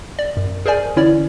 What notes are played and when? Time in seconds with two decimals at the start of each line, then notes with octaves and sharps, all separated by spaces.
0.19 D5
0.37 F#2
0.66 G#4 A#4 C5 D5 G#5
0.96 D3 E3 C#4 E4 C#5 D5